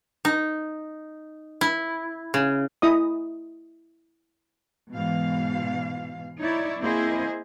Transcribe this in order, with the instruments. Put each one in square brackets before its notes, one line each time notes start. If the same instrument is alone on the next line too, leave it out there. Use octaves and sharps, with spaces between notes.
[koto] D#4
E4
C#3
[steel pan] E4 D#5 D#6
[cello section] G#2 B2 E3 F5
D#4 E4 C#5 D5
A#3 C4 E4 G#4 C5 D#5